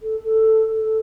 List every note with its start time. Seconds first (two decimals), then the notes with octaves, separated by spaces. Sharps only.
0.01 A4
0.24 A4
0.75 A4